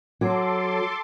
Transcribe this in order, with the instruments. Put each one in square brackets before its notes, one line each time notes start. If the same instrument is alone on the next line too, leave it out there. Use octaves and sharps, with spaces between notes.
[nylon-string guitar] F#3 [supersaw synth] A4 C6 D6